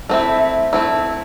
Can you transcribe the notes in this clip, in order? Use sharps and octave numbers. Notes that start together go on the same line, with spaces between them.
A3 C4 E4 E5
A3 C4 E4